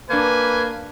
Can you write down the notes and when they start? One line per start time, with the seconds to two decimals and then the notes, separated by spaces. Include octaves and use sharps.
0.10 A#3 D4 B4 G#5 A5 C#6